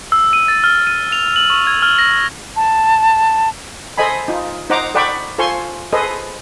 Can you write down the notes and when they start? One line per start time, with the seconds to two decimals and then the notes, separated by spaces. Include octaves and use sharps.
0.12 E6
0.33 D#7
0.48 A6
0.64 F6
0.87 D#7
1.12 F7
1.36 F#7
1.50 C#6
1.67 G#6
1.82 F6
1.98 A#6
2.56 A5
3.97 A4 C5 D#5 G#5 B5
4.28 D#4 F4
4.70 D#4 C5 F#5 A#5 D6
4.94 A4 D5 F#5 G5 B5 C#6
5.38 F4 A4 C5 G#5 C6 C#6
5.92 G#4 A4 B4 C5 D#5